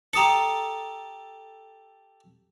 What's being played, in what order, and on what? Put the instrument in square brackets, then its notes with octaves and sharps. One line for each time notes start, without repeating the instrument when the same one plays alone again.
[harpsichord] G4 A4 [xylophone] A#5 D#6 C#7